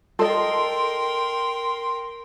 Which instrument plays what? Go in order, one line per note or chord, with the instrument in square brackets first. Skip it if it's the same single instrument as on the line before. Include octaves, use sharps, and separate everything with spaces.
[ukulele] A4 D#5 [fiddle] A#4 G5 [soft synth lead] C6